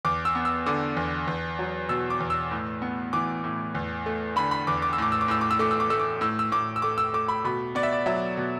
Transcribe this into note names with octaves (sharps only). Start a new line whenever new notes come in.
E2 D6
E6
B3
E6
D3 D6
E2
E2
F#3
B2 E6
D6
E2
E6
A2
B3
E3 D6
A2
E2
A3
D3 B5
B5
E2 D6
D6
E6
A2 D6
E6
D6
A2 E6
D6
E6
A3 D6
E6
D6
A3 E6
D6
A2 E6
E6
A2 D6
E6
A3 D6
E6
A3 D6
B5
B2 B5
B3 D5
E5
D5
F#3 E5
B2